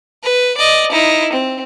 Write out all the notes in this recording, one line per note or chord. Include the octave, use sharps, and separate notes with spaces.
B4
D5 D#5
D#4 E4
C4